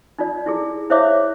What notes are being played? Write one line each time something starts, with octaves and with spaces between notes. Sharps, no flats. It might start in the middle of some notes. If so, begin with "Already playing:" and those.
D#4 F4 D5
E4 G4 G#4
E4 C5 C#5 E5 F5 D6